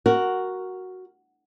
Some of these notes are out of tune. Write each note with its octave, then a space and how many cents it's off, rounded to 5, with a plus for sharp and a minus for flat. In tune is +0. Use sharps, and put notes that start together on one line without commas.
F#4 +0 A#4 +0